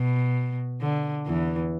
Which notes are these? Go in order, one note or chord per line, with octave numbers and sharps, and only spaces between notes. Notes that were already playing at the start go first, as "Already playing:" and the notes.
Already playing: B2
D3
E2 E3